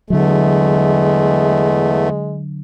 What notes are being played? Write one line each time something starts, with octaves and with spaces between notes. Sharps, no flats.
E2 D3 F#3 G#3 A3